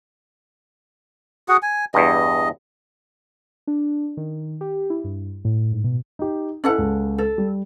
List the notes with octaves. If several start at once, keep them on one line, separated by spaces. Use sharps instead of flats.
F#4 G#4 F#5
G#5
E2 G2 D#5
D4
D#3
G4
E4
G2
A2
G#2
B2
D#4 G4
C#4 E4 A4 D#5 F#5
C#2
A4
G3